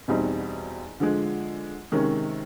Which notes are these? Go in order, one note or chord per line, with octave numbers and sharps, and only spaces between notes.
E2 B2 G3 C4 D#4
D3 F3 G#3
C3 D#3 G#3 C#4